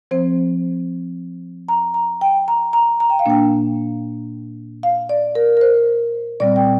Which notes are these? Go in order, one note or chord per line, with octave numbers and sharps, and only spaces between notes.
F3 C4 C5
A#5
A#5
G5
A#5
A#5
A#5
G5
F5
A#2 A#3 D4 G5
F5
D5
A#4
A#4
C5
A#2 G3 C4 D5
G5